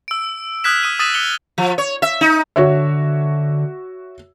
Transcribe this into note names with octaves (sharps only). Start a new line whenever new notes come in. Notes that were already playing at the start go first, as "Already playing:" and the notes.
E6 D7
D#6 F6 F#6 G#6 B6 E7
D#6 D#7
D#6 E6 A6 B6 D#7 E7
D#6 C#7 F7 G7
F3
C#5
E5
D#4
D3 F#4 C#5 E5